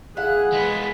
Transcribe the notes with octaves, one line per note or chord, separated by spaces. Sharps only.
E4 G#4 F5 F#5 F#6
G#3 B3 B6